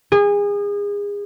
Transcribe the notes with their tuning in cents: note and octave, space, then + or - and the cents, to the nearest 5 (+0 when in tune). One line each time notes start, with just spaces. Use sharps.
G#4 -30